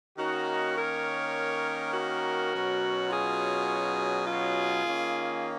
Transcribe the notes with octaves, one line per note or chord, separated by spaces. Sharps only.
D#3 A#3 C#4 D#4 F#4
A#4 C#5
F#4 A#4
B2 F#3 C#4
F4 G#4
F4 G#4
D#3 A#3 C#4